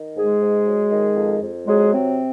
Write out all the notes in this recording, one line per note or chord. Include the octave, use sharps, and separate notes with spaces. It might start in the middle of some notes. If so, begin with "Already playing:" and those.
Already playing: D#3
G#2 G#3 G#4
G#2
F#3
D#3
F2
F2
F#3 G#3 G#4
C3 C4